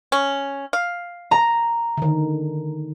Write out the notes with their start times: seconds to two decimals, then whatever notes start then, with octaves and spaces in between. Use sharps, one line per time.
0.12 C#4
0.73 F5
1.31 A#5
1.97 D3 D#3